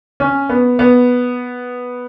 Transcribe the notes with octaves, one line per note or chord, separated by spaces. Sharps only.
C#4
B3
B3